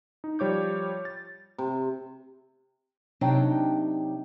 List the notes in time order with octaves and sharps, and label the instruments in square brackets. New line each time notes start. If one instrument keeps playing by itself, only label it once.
[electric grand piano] D#4
F3 G3 C#5 D6 G6
A6
[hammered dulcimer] C3
[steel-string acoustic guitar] C3 F#3 D4 D#4 G5